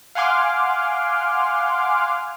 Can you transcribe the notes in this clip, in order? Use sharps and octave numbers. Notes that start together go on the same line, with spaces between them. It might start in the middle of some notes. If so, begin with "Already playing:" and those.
F5 F#5 G#5 C6 D6 F6